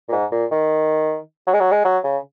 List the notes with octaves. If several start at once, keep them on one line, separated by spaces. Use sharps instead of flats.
A#2
G#2
A#2
D#3
F#3
G#3
F#3
G#3
F#3
C#3